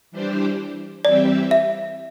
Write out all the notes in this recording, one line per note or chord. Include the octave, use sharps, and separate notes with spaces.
E3 G3 D4 G4 C5
E3 G3 C4 G4 D5 E5
E5